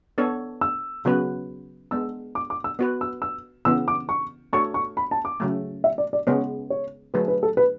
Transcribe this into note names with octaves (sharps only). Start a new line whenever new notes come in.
B3 D4 A4 C#5
E6
C#3 F#3 B3 F#4 B4
G#3 B3 D4 E6
D6
D6
E6
B3 F#4 B4
E6
E6
C#3 E3 B3 E6
D6
C#6
A3 D4 F#4 A4 C#5 C#6
C#6
B5
A5
D6
C#3 F#3 A3
E5
D5
D5
C#3 G#3 B3 C#5
C#5
D3 F#3 A3 D4 G#4 B4
B4
A4
B4